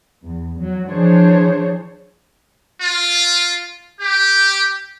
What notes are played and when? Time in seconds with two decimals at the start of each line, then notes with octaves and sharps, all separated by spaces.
0.23 E2
0.58 F#3
0.88 E3 F3 D4 G#4 C5 C#5
2.81 F4
3.99 G4